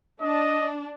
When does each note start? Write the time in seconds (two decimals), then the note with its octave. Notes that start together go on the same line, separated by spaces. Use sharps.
0.21 D4 D#5